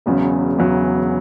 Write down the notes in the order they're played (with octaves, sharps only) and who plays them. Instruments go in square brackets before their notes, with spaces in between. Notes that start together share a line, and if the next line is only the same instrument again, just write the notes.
[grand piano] E1 E2 C#3 F#3
E1 E2 C#3 F#3